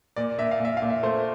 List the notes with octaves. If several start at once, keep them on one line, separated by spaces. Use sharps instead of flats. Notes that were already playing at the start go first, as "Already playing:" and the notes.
A#2 D5
A#2 E5
F5
A#2 E5
A#2 F5
E5
A3 C5